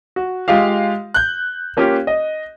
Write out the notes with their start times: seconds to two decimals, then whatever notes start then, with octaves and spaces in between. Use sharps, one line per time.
0.16 F#4
0.48 G#3 F4 G4 F5
1.14 F#6 G6
1.77 A#3 C#4 F4 G4
2.07 D#5